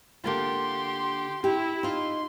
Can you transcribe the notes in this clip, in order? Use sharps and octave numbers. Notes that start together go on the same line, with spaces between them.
D3 A#3 F4 G4 C6
E4 G4
D#4 F4 C6